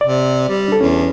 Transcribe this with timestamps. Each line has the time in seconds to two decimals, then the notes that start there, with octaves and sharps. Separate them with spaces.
0.01 C3 D5
0.49 G3
0.68 D4 A4
0.81 E2 C#4